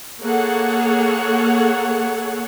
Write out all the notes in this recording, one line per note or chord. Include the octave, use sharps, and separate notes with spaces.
A#3 G#4 A4 C#5 F#5